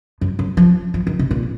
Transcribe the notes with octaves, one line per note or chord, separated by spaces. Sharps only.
F#2
F#2
F3
F3
D#3
B2
A#2